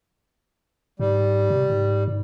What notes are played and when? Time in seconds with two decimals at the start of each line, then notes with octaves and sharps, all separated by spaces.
1.00 G#2 G3
1.50 C3
1.70 G#2
2.08 G#2